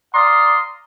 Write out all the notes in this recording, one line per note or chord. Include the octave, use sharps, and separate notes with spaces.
D5 F5 A#5 C6 D#6